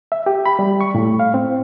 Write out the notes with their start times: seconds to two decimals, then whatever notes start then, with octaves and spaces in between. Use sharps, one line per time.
0.12 E5
0.26 G4
0.46 B5
0.59 G3
0.81 C#6
0.95 A2
1.19 F5
1.34 C4